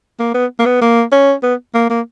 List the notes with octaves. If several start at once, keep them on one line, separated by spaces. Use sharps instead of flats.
A#3
B3
A#3
B3
A#3
C#4
B3
A#3
A#3